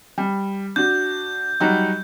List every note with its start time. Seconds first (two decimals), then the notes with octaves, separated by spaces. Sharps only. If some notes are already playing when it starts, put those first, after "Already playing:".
0.18 G3
0.76 D4 F#4 G6
1.60 F#3 G3 D#4